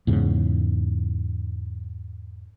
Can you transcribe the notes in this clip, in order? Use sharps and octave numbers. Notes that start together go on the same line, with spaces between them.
E2 G#2 C#3